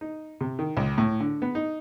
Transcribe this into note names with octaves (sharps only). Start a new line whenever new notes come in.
D#4
C3
D#3
C#2
A2
D3
B3
D#4